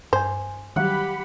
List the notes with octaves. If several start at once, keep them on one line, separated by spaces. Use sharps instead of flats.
G2 C5 G#5
D#3 F#3 G3 G4 F#5 B5